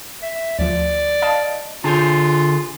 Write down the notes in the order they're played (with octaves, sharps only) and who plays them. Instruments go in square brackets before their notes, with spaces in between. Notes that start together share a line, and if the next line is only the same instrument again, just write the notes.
[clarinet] E5
[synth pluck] D2 F3 [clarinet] D5
[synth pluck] D#5 F5 A5
[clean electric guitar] D3 G#4 [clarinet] F4 [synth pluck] A5 G6